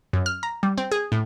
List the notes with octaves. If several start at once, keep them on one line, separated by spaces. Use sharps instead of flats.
F#2
F6
A#5
G3
C4
G#4
A2